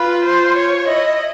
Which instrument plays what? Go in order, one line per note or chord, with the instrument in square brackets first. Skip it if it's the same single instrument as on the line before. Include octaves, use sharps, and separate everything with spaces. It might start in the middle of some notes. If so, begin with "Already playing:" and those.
Already playing: [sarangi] F4 [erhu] B4
[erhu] C5
C#5
[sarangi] E4 [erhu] D#5